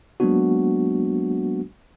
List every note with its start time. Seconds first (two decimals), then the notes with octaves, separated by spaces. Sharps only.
0.20 F#3 G#3 A#3 B3 D4 F#4